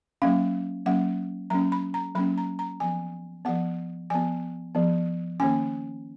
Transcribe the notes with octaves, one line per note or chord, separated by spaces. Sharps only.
F#3 A#3 C#4 F5
F#3 A#3 C#4 F#5
F#3 A#3 C#4 A#5
B5
A#5
F#3 A#3 C#4 B5
A#5
A#5
F3 B3 G#5
F3 B3 F#5
F3 B3 G#5
F3 B3
D#3 A#3 C#4 G#5